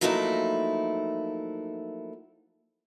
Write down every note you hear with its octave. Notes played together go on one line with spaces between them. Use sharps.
F3 F#3 A3 A#3 D#4 E4